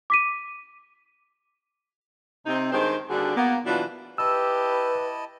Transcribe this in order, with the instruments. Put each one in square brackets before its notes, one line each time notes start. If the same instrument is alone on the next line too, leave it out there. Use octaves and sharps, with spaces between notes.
[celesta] D6 B6 D#7
[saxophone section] C3 C4 D#4
G2 D#3 G#3 G4 C5
D#2 D3 G3 D4 F#4 G#4
A#3 B3
B2 E3 F#3 D4 F4 F#4
[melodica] E4 D#5 A5 [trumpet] G4 [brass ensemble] B4 [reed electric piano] E6